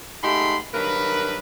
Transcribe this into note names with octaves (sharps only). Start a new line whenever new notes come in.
G#2 A3 D#4 G4 B5 C6
G2 D#3 F#3 A#4 B4